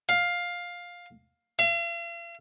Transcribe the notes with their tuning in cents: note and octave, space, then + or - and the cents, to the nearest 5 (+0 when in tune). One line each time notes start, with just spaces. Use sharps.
F5 +10
F5 -45